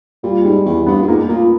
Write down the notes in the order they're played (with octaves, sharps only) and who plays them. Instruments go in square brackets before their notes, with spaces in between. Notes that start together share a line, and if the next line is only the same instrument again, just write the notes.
[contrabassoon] A#2 [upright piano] G3
[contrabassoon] G#2 [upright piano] G3
[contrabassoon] E2 [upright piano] G3
[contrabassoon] G2 [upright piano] B3
[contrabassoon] A#2
[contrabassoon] G#2 [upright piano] A#3
[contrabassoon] A#2 [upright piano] A#3